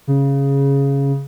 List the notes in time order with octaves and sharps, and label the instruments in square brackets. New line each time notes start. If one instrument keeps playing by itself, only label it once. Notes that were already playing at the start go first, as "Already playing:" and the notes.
[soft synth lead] C#3